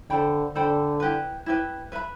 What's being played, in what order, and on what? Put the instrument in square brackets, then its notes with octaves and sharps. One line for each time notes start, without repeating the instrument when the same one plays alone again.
[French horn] D3 [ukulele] A4 C5 G5 B5
[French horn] D3 [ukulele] A4 C5 G5 B5
[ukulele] E4 G4 B4
E4 G4 B4
B4 E5 B5